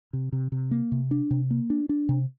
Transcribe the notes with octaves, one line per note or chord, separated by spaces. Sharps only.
C3
C3
C3
A#3
C3
D4
C3
A#3
D4
D4
C3